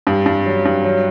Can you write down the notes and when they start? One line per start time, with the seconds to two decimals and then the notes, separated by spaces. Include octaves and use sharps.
0.07 G2
0.26 G2
0.46 F#3
0.65 G2
0.84 F#3